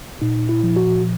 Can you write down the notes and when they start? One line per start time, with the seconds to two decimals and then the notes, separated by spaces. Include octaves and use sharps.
0.22 A#2 D#4
0.49 E4
0.63 F3
0.76 F#4